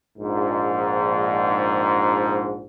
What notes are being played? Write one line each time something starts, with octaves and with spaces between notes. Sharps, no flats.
A#1 G#2